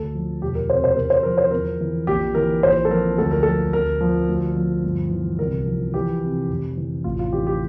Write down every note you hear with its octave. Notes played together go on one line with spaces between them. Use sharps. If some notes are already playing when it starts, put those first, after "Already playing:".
Already playing: D2 A4
F3
E1 G4
A#4
C3 C5
C5
E2 A#4
C5
F3 A#4
C5
E2 A#4
E3
A#1 G4
E3 A#4
A#1 C5
A4
F3 A#4
D2 A4
A#4
F3 A4
D2 A#4
F3
D2
F3
G1
E3
C2 A#4
F3
E3 G4
C3
F1
E3
A1 F4
F4
E3 G4
G4